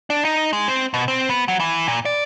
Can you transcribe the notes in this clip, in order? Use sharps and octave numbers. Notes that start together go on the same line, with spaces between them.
D4
D#4
G#3
C4
B2
C4
B3
F#3
E3
A#2
D5